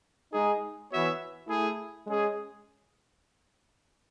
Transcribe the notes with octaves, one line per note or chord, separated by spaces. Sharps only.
G#3 D#4 G#4
E3 B3 F#4 C#5 E5
A3 E4 G#4
G#3 C#4 G#4